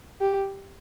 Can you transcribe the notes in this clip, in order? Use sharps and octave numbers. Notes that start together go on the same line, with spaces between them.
G4